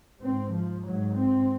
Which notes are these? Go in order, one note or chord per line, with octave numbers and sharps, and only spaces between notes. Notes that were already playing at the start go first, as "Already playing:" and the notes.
G#2 C4
F3
G#2 F#3
C4